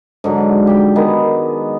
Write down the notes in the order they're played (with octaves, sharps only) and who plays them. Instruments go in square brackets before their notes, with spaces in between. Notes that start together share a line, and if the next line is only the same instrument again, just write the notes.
[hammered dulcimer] G#2 D3 F#3
G4 G5
D#3 G#3 B3 G#4